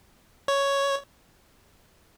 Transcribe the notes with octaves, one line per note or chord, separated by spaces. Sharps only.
C#5